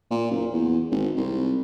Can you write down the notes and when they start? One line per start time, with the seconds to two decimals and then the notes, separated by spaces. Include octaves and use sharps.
0.10 A#2
0.31 F#1
0.52 E2
0.91 G#1
1.16 C2